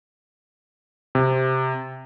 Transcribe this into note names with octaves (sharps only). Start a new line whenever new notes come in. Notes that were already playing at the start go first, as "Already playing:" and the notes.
C3